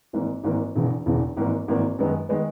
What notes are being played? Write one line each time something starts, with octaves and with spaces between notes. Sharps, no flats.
G#1 G#2 E3 A#3
G#1 G#2 E3 A#3
E1 E2 C#3 E3
E1 E2 C#3 E3
G#1 G#2 E3 A#3
G#1 G#2 E3 A#3
F#2 D#3 G#3 B3
D#3 G#3 B3